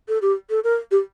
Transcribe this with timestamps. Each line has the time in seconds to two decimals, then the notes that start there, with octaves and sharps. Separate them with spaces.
0.08 A4
0.22 G4
0.50 A4
0.64 A#4
0.91 G4